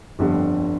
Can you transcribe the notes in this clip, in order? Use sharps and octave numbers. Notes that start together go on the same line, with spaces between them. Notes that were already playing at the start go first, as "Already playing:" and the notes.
G1 F2 D3 G3